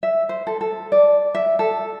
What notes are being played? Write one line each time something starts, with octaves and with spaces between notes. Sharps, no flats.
E5
C5
A4
A4
D5
E5
A4